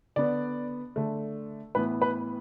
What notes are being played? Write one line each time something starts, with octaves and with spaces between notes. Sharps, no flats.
D3 B3 D5
D3 A3
A2 E3 B3 B4
B4